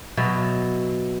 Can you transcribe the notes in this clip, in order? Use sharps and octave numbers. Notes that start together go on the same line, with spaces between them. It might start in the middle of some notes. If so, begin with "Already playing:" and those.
B2 F#3 E5